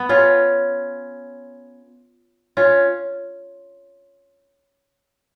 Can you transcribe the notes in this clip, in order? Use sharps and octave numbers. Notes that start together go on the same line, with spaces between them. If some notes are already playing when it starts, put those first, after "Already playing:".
Already playing: B3
C#4 F4
C#4 F4